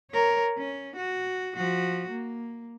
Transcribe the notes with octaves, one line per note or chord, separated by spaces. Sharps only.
A#4 C#5
C#4
F#4
F3 F#4
A#3